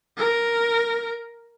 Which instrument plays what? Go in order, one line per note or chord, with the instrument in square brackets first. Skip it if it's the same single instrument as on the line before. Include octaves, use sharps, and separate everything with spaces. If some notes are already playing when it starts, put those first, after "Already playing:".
[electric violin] A#4